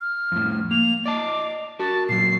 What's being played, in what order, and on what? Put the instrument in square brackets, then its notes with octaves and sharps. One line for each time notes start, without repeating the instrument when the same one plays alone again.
[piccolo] F6
[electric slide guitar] F2 A2
[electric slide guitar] A#3 [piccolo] F7
[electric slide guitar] D5 D#5 A5 [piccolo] D6
[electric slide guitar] F#4 A#4 [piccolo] A5
[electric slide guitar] A#2 F#3 [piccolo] C7